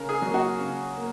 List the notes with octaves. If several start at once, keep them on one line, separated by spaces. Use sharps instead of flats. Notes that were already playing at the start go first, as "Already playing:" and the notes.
Already playing: C#3 A#4
G#4
F#3 A#3
F#4
C#3
A#3